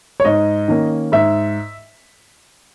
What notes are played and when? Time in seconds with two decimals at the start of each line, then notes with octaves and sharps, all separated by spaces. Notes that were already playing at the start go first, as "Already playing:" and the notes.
0.20 C#5
0.25 G#2 D#5
0.68 D#3 A#3 C#4
1.12 G#2 E5